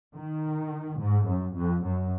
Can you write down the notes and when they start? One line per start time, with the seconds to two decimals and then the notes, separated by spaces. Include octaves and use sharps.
0.13 D#3
0.98 G#2
1.26 F#2
1.55 F2
1.83 F#2